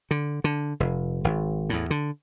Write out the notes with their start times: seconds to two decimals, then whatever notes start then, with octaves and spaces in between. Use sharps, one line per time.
0.11 D3
0.44 D3
0.80 F1
1.24 G#1
1.70 E2 A2
1.90 D3